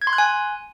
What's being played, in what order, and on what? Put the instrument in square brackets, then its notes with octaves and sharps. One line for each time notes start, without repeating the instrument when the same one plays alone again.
[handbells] G#6
C6
F#6
G#5